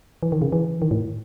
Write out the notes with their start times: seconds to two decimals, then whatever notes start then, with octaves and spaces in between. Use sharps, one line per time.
0.23 E3
0.32 D#3
0.42 C#3
0.52 E3
0.82 D#3
0.91 A2